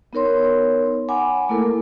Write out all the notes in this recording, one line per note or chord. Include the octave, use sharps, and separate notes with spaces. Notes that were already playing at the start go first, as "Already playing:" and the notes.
B3 D#4 A#4 C#5 C6
F#5 G#5 B5 D6
A3 A#3 E4 A4 A#4